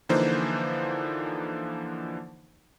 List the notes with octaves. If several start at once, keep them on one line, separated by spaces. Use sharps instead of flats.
D3 E3 F3 A#3 D#4 C5